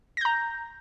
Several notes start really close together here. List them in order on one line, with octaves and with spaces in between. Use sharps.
A#6 G6 A#5